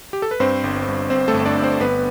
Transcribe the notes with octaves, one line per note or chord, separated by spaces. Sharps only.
G4
A4
B4
G2 C4 C5
G1
G2
G1 C4 C5
A3 A4
G1
D4 D5
G2
C4 C5
G1 B3 B4